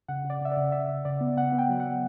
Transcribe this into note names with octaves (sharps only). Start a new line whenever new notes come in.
C#3 F#5
C#3
D5
C#3 E5
D5
C#3
C#3 E5
C#3
C#3 D5
B3
C#3 F#5
B3
G5
F#3
F#5
F#3